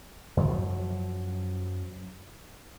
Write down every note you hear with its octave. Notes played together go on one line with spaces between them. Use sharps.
F#2 F3 F#3